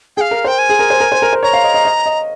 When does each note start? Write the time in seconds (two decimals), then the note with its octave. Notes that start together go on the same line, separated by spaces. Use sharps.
0.17 G#4 G5
0.21 F5
0.31 A#4
0.44 C5
0.48 G5
0.59 G#5
0.69 G#4
0.79 A#4
0.90 C5
1.00 A#4
1.12 C5
1.22 A#4
1.33 C5
1.43 C#5 A#5
1.53 F5
1.64 D#5
1.74 D#5
1.85 D#5
2.06 D#5